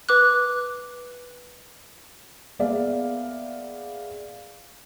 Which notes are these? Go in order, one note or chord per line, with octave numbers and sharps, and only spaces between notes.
B4 D6 F#6
A#3 B3 G#4 D5 E5 F5